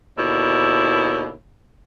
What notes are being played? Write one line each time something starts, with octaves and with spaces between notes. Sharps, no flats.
D#2 B2 D3 E4